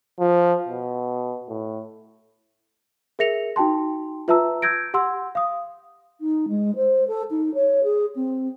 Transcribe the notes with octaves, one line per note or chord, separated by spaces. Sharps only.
F3
B2
A2
G#4 A#4 E5 A#6 C#7 F7
D#4 F#4 G5 A5 C6
F4 B4 E5 A5 A#5 E6
E6 G6 G#6 A#6 D7
G4 F#5 C6 E6
F5 D#6
D#4
G#3
C5
A4
D#4
C#5
G#4
C4